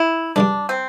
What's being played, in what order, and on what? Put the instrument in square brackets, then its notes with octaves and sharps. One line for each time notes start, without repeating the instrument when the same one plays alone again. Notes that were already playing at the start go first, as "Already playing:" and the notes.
Already playing: [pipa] E4
[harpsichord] G2 D3 G3 [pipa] D4
[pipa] C4